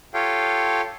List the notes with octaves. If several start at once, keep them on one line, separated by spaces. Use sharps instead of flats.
F4 G4 A4 C#5 F5 G5